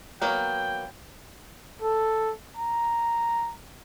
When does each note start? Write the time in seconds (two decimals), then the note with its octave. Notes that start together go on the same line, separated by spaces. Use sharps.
0.22 F#3 A#3 B3 G5
1.82 A4
2.57 A#5